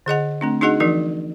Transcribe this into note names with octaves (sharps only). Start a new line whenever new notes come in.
D3 G#4 D#5 F#5
A3 C4 D4
D4 D#4 F#4 G#4 D#5 F#5
E3 F3 D#4 F#4 A#4